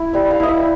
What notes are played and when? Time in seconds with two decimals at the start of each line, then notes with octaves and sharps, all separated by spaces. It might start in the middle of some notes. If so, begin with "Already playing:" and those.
Already playing: E4
0.13 G3 E5
0.31 F5
0.40 E4 D#5
0.48 E5